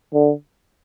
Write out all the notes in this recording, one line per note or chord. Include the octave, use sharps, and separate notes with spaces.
D3